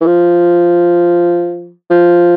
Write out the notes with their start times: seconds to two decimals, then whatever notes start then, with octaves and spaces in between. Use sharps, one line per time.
0.01 E3
0.06 F3
1.90 F3